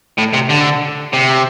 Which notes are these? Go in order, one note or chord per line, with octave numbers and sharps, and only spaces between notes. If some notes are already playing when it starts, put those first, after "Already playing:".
A2
C3
D3
C3